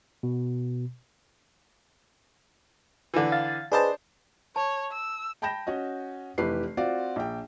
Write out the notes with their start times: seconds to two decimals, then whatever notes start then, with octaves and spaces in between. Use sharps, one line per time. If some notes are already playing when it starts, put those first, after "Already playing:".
0.23 B2
3.14 D3 E3
3.32 F5 A6
3.72 D4 G#4 B4 C5 D#5 A5
4.56 C#5 A5
4.92 E6
5.42 G5 A5 B5 G6 A#6 E7
5.67 C#4 F#4 D#5
6.38 F1 E3 G4 B4 C7
6.77 C4 F4 F#4 D5
7.16 A#1 G5